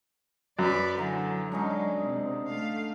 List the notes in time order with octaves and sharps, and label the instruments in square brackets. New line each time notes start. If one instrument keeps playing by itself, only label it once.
[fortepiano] F#2 [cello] B4 D5
[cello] D3 F#3 [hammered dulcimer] E3 A#5
[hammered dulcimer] D3 C#4 D#4 [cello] F#3 G#3
[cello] C3
A3 F5